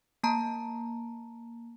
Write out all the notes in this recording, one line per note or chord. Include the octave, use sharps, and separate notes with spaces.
A#3 A5 A#5